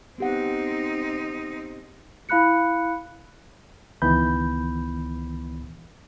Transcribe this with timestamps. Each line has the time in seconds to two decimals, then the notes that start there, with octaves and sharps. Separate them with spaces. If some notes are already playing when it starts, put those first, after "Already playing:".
0.18 B3 C4 D#4 G4 F#5
2.29 E4 F5 B5 F#6 C#7
4.02 C#2 D#3 E3 B3 B5 G6